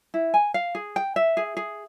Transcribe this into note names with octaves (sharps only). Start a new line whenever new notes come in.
E4
G#5
F5
G#4
G5
E5
G#4
G#4